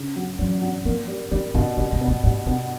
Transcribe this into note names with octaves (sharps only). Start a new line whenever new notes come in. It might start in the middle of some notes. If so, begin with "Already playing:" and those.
Already playing: C#3
F#3
E2 F#3
F#3
F3 A#3
G3
D#3 G3
B2 D3
C#3 G3
C3
B3
A#2
A2 G3
B2 B3